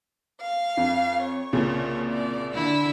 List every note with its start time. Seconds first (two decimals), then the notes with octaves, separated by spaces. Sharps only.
0.40 F5
0.77 F2
1.23 C#5
1.53 C2 A#2 C#3
2.07 D5
2.52 D3 E4 E6